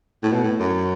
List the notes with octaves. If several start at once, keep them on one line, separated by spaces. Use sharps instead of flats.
A2
B2
A2
F#2